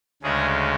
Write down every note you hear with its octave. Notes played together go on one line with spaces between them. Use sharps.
D2 C#3 G#3 G#4